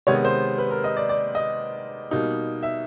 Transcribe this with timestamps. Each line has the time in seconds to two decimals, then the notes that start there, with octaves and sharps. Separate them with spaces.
0.07 C3 D#3 G#3 B3 C#5
0.25 C5
0.58 B4
0.71 A#4
0.84 D#5
0.97 D5
1.09 D5
1.35 D#5
2.11 B2 G3 A#3 D#4
2.63 E5